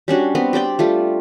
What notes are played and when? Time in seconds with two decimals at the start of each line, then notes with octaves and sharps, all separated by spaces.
0.08 G3 C#4 D4 F#4
0.35 B3 C4 B4
0.53 G4 C5 D5 G5
0.79 G3 A3 F4